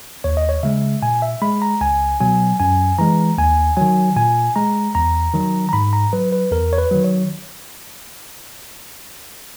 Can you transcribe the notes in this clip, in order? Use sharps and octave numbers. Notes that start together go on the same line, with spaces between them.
D#2 C#5
D#5
C#5
C#3 G#3 E5
A#2 G#5
E5
G#3 B5
A#5
C#2 G#5
B2 F#3 G#5
F#2 G#5
E3 G#3 A#5
D#2 G#5
D#3 F#3 G#5
A#2 G#5
G#3 A#5
E2 A#5
D#3 F#3
A#5
G#2 B5
A#5
F#3 B4
B4
E2 A#4
C#5
B4
D#3 F#3
C#5